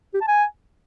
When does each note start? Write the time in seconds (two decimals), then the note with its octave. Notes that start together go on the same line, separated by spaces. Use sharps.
0.14 G4
0.21 A5
0.28 G#5